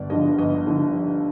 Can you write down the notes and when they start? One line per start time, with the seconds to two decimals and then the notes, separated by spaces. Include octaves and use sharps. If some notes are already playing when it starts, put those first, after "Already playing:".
Already playing: G1 D5
0.10 G2 D3 F3 D#5
0.38 G1 D#5
0.66 D3 F3